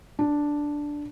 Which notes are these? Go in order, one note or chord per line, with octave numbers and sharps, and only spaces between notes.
D4